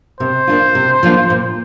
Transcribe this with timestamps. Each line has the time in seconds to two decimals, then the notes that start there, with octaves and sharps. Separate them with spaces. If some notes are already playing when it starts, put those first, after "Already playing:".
0.20 C3 C5
0.47 F3 A#3 D4 F4
0.75 C3
1.03 F3 A#3 D4 F4
1.30 A#2